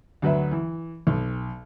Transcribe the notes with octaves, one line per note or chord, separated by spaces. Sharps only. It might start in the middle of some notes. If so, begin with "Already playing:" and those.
D2 F#3 B4 E5
E3
B1